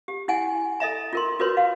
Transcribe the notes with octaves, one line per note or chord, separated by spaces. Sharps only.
G4
E4 F#5 G#5
A4 D#5 E5 A#5
F4 A#4 C6
F4 F#4 A#4 B4 C#5 C6
F5